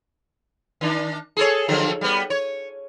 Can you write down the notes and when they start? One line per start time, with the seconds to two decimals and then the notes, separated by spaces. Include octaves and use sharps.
0.81 D#3 D4
1.37 G#4 A4 C#5
1.68 D3 F3 F#3
2.01 G3 B3
2.30 C#5